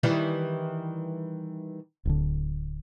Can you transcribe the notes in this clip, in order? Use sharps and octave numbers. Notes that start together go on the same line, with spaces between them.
D#3 E3 G3
D1 D3